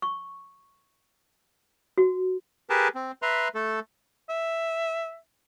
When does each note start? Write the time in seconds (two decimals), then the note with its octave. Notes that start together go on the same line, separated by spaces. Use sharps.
0.02 C#6
1.98 F#4
2.70 G4 G#4 A#4 B4 A5
2.95 C4
3.22 B4 E5 A#5 C6
3.55 A3 A4
4.29 E5